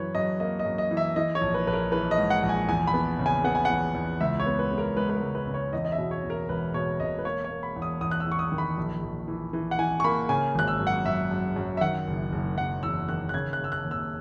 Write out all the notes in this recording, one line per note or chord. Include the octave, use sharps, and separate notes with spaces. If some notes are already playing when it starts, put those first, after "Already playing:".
Already playing: F#2 E3 B4 C#5
F#2 D#5
A#3 D#5
D#5
F#2
D#5
E3
E5
E3 D#5
C#5
A#1
B4
A#1 B4
A#4
E3 B4
D#5
G#2
F#5
A#1
G#5
E2 G#5
B5
B3
C#3
G#5
B3 F#5
G#5
E2 F#5
E2
C#2 E5
C#5
B3
B4
B3
A#4
G#3 B4
B4
A#4
C#2
B4
C#3
C#5
E2 D#5
D#5
E5
B2
C#5
E2
A#4
E1 B4
B2 C#5
E1 D#5
B4
A#3 C#5
C#5
A#3
B5
E2
D#6
E2 D#6
F#6
E6
E2
C#6
D#6
D#3
B5
A#1
A#1
E3
E3
F#5
E3 G#5
C#6
A#3 B5
C#3 G#5
G#1 F#6
E6
F#2
F#5
F#2 E5
F#2
F#2
E5
D#3 F#5
F#1
F#1
F#1 F#5
E2 E6
D#3 F#6
F#6
C#3 G#6
F#6
C#3 E6
F#6
D#2
E6